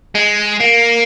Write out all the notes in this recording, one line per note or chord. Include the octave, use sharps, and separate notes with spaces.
G#3
A#3